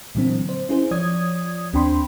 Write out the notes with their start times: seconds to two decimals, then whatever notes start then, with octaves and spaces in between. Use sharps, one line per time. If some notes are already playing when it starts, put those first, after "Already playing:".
0.15 A#2 D3 E3 F#3 A#3 C4
0.49 C5
0.69 C#4 E4 G#4 C5
0.91 F3 C#5 D5 D#6 G#6
1.73 D#2 C4 D4 G5 B5 C6